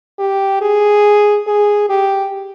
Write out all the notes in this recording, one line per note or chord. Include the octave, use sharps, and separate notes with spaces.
G4
G#4
G#4
G4